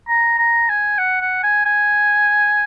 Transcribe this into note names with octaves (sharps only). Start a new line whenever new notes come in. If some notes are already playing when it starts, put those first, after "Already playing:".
A#5
A#5
G#5
F#5
F#5
G#5
G#5